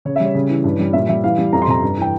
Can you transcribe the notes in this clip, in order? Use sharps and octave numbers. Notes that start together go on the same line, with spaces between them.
C#3 C#5
G3 E5
C#5
C#3
E3
G2
G3
A#2 E5
G3 E5
E3 F5
G3
F2 A#5
C6
C3 A#5
G2
E3 G5